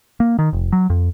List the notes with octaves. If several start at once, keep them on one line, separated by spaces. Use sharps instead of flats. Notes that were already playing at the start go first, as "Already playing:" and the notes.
A#3
D#3
F1
F#3
F2